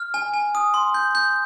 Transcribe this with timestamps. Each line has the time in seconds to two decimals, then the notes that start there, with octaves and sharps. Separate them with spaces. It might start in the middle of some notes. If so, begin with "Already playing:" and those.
Already playing: F6
0.14 G#5
0.34 G#5
0.55 D#6
0.74 C6
0.94 G6
1.15 G6